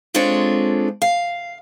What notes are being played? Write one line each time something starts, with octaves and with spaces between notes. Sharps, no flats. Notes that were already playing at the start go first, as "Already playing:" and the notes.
G#3 C4 D4 F4 A4 C#5
F5